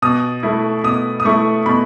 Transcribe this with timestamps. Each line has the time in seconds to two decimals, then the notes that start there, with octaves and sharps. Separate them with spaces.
0.02 B2 D#6
0.43 A3 E4
0.84 B2 D#6
1.20 D#6
1.25 A3 E4 C#6
1.66 B2 B5